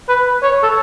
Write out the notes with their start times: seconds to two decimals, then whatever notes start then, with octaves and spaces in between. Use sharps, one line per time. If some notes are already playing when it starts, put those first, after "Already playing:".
0.09 B4
0.43 C#5
0.63 A4